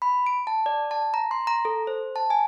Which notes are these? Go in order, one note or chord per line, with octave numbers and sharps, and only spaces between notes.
B5
D7
A5
D5
A5
A#5
C6
A#5
A4
C5
A5
G#5